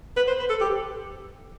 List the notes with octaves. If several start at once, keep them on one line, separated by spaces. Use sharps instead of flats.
B4
C5
B4
A4
G4